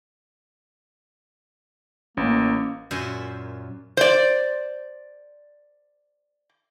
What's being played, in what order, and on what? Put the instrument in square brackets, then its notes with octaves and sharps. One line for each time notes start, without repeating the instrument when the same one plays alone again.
[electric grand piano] A1 [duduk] A#3 [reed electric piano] C#4
[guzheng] F#2 A#2 C5 E5 G#5
[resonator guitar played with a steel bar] C5 D5